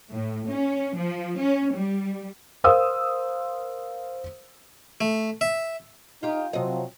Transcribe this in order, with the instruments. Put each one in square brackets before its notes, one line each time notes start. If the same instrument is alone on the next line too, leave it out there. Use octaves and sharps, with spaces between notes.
[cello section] A2
C#4
F3
C#4
G3
[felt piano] A#4 C5 F5 D#6 E6
[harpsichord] A3
E5
[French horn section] D#4 [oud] F4 G4
[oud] C3 D#5 [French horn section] F3 F#3 C4